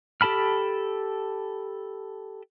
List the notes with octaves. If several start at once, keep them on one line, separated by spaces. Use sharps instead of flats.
G4 A4 A5 B5 F6